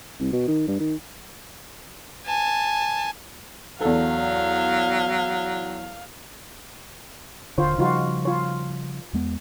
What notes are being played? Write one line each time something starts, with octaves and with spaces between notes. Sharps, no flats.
C2
B2
D#3
G2
D#3
G#5 A5
E2 F#3 A4 F5
D#1 D3 F4 C5 C#5
C#3 F3 G3 D#4 F4 F#4
F4 C#5
E2 G#3 B3